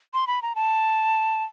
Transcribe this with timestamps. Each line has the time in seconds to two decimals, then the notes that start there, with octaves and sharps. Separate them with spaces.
0.14 C6
0.27 B5
0.42 A#5
0.55 A5